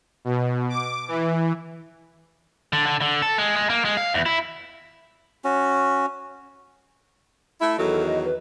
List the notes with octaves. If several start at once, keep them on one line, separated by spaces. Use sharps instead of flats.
B2
D6
E3
D3
D3
D3
A4
G#3
G#3
A#3
G#3
F5
E2
E4
C#4 F#4
A3 E4
E2 D#3 F#3 A4
D#5
B4